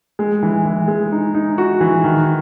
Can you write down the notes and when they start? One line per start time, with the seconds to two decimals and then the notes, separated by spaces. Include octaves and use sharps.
0.19 G#3
0.43 E3
0.65 E3
0.88 G#3
1.12 D#4
1.34 D#4
1.58 F#4
1.81 E3
2.04 D#3